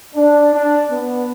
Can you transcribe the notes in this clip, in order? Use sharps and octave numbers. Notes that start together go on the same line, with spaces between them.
D4
D4
B3